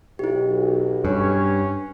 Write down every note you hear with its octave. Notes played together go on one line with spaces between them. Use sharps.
B1 E4 G4
G2 C#4 C#5